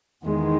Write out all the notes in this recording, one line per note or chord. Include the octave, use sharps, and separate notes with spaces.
E2 D#3 G#3